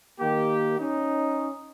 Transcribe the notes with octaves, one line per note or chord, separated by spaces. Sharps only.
D#3 A#3 G4
C#4 D#4